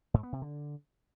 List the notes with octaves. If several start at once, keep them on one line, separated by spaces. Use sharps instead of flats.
G#2
B3
C3
D3